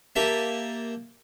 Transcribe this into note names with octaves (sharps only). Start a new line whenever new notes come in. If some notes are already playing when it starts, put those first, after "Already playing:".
A#3 G4 E5 A5